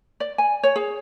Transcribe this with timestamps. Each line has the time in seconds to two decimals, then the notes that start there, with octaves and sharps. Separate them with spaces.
0.20 D5
0.38 G#5
0.63 C#5
0.76 G#4